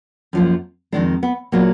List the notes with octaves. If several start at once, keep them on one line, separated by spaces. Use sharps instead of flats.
F#2 F3 A#3
F2 D#3 G#3 D4
B3
A#2 F#3 A#3 B3